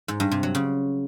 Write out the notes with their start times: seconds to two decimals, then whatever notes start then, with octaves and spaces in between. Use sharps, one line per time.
0.08 G#2
0.20 G2
0.31 C3
0.43 F#3
0.55 C#3